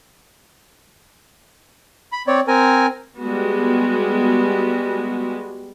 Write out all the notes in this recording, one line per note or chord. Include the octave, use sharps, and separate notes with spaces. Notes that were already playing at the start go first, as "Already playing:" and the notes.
B5
C4 C#5 D5
C4 A#4 G#5
G3 G#3 B3 F#4